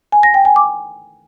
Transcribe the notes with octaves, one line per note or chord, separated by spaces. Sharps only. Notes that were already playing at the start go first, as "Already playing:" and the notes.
G#5
A#6
G5
G#5
D6